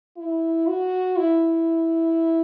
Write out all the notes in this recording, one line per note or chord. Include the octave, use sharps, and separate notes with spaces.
E4
F#4
E4